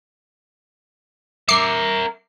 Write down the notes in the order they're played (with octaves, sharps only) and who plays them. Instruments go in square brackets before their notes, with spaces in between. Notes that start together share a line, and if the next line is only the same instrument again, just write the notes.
[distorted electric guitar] A#4 E5 [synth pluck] D6 C7 C#7